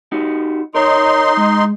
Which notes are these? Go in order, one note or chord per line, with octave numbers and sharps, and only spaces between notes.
D#4 F#4 G4
D#4 A#4 C#5 C6
G#3